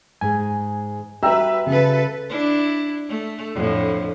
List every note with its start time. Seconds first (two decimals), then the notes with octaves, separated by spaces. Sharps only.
0.21 G#2 G#3 G#5
1.23 G3 F#4 B4 E5 G5 A#5 E6
1.66 C#3 A4 B4
2.30 D4 E4
3.09 A3
3.54 F2 A2 D3